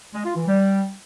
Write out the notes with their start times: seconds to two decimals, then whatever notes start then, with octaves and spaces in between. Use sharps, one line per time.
0.14 G#3
0.25 F4
0.36 E3
0.47 G3